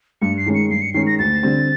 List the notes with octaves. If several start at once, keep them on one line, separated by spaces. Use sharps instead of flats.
G2 C#7
C7
D#3 G#3 C#4
C#7
G2 C7
C#7
D#3 G#3 C#4 C7
A#6
D2 A6
D3 G3 C4